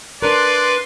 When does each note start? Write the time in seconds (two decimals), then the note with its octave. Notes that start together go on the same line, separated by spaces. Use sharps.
0.22 D4 A#4 B4 D5 C6